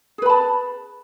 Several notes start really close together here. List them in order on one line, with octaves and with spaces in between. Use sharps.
G#4 B4 B5 A5